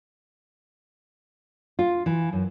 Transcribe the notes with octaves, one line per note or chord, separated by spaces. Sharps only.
F4
E3
F#2